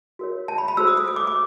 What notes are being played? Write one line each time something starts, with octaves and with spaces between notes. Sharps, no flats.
F#4 A#4 C#5
A5
B5
B5
F#4 A4 C5 E6
D#6
D#6
D#6
D6
D6